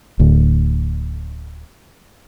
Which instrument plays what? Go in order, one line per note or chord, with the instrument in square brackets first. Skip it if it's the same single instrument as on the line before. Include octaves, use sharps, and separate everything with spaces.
[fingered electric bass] D1 D2